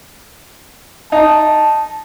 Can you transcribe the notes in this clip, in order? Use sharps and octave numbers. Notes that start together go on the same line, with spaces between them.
D#4 A5